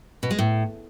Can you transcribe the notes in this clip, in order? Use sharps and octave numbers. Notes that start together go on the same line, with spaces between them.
B2
G#3
A2